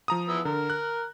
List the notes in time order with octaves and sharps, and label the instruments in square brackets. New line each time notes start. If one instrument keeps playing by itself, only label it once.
[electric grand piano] F3 A#5 D#6
[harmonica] E3 B3 E6
[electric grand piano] D3 [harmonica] A#4
[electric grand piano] F#6